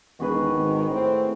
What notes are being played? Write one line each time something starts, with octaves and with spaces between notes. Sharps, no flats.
E1 D#3 F#4 G#4 B4
G#1
A2 C4